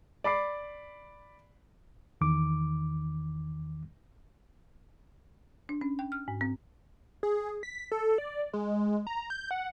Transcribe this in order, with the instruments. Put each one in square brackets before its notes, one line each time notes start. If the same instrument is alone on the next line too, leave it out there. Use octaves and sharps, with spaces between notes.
[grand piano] D5 B5 D6 C7
[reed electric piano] E2 D#3 D6
[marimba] D4
C#4
G5
F6
G#2
C4
[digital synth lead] G#4
B6
A4
D5
G#3
A#5
G6
F#5